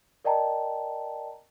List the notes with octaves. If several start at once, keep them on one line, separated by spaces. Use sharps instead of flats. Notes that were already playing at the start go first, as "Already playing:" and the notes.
A#4 D5 D#5 G5 A5 A#5